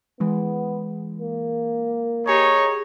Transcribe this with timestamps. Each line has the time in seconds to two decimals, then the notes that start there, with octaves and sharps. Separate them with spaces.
0.20 E3 G#3 B3
1.19 A#3
2.27 D#4 G4 G#4 C#5